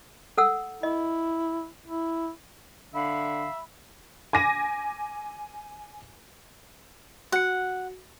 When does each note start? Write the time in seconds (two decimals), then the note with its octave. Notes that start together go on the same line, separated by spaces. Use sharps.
0.38 A4 F#5 E6
0.83 E4 D#5
1.85 E4
2.94 D3 E5 F5 B5
4.33 G#5 D6 A#6 D#7
7.32 F#4 F#5 C#7